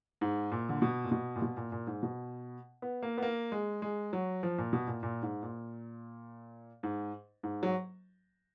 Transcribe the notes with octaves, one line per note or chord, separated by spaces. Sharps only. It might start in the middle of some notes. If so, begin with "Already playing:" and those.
G#2
A#2
D3
B2
A#2
B2
A#2
B2
A#2
A#2
G#2
B2
B3
A#3
B3
A#3
G#3
G#3
F#3
F3
A#2
B2
A#2
A#2
G#2
A#2
G#2
G#2
F#3